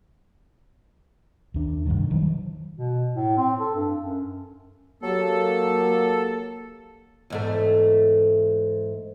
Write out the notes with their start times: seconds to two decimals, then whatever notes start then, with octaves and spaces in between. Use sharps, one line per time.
1.54 D#2 D4
1.86 F1 A#1 G2 D#3
2.11 D#3 F#3 G3
2.76 B2
3.16 A2
3.37 C4
3.60 A4
3.75 G2
4.02 F#2
5.02 F#3 A#3 G4 A4
7.30 E2 G#2 A3